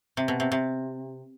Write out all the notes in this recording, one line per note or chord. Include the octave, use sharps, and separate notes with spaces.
C3
B2
C3
C3